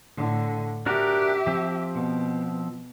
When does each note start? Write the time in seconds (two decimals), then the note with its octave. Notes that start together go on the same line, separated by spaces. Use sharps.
0.17 A2 D3
0.86 D4 F#4 G4 A#4 E5
1.47 F3 C4
1.94 B2